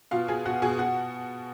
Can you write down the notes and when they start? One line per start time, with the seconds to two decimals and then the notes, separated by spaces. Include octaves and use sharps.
0.11 B2 F4 F5
0.28 B2 G#4 G#5
0.46 B2 F#4 F#5
0.62 B2 G#4 G#5
0.79 B2 F#4 F#5